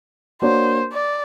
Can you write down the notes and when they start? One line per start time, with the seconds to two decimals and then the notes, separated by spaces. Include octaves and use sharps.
0.42 A#3 D4 F#4 A#4 C5 C#5
0.92 D5